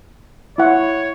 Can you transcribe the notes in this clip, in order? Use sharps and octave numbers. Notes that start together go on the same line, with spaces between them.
E4 C#5 F#5